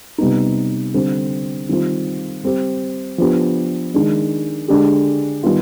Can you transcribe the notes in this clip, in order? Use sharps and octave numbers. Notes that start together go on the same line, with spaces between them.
C3 G3 B3 D#4
D3 G3 C4
D#3 G3 C4 F4
G3 C4 G4
F3 B3 D4 G4
D#3 G#3 D4
D3 G#3 D4 G4
D#3 G3 B3 F4